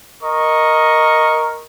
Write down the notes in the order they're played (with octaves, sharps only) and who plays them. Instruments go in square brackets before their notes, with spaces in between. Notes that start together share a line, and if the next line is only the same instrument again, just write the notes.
[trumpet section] A#4 D#5 C#6